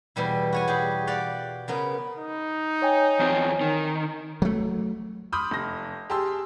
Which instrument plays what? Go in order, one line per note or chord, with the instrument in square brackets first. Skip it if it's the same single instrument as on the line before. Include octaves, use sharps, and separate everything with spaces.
[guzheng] E2 B2 G3 E4
F#4 C#5 G#5
G3 G4 G#4
G4 D5 F5 F#5
C#3 B3 A#4
[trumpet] D#4
[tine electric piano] C#5 G5 G#5
[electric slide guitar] E2 C4
D#3
[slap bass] F#3 A3
[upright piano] B5 C6 D6 D#6 F6 G6
F1 A#6
G4 G#4 A5 C6 E6